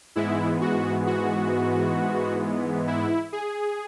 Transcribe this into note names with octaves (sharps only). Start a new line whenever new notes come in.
G#2 E3 G#3 B3 E4
F#4
F#4
E4
G#4